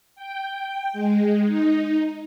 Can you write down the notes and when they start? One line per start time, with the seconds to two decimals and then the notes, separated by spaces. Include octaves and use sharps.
0.15 G5
0.93 G#3
1.44 D#4